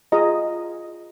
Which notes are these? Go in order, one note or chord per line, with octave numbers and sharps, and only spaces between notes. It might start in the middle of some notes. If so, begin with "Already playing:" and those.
F4 G#4 D#5 A#5